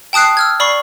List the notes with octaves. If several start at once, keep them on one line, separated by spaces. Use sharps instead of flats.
G5 A5 D#6 F#6 C7
E6 F6 G#6
D5 B5 C#6 C7